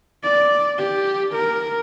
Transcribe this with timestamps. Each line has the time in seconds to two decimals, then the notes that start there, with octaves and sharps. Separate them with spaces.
0.23 D5
0.78 G4
1.34 A#4